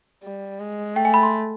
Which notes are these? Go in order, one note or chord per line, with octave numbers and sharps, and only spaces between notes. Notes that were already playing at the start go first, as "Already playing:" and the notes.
G3
G#3
A3 G5
G#5
B5
C6